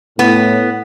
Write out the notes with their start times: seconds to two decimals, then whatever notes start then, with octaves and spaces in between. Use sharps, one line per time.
0.19 A2 B3